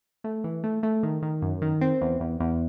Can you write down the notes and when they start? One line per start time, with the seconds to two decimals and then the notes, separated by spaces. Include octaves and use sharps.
0.24 A3
0.44 E3
0.64 A3
0.83 A3
1.03 D#3
1.22 D#3
1.42 F#2
1.62 D#3
1.81 C4
2.01 E2
2.20 E2
2.40 E2